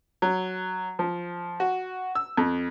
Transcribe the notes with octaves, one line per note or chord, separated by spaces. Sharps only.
F#3
F3
F#4
E6
F2